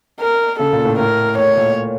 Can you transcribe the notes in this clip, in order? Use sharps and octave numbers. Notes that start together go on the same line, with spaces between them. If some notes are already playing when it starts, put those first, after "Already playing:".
A#4
C#3 A4
A#2
A2
A2 A#4
A2 C#5
A#2